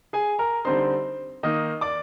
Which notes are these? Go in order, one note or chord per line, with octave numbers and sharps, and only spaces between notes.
G#4 G#5
A#4 A#5
D3 G3 C4 D#4 C5 C6
D#3 A#3 D#4 D#5 D#6
D5 D6